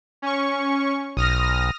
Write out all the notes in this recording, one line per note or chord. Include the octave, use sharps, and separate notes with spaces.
C#4 C#6
B1 D#6 F6 A#6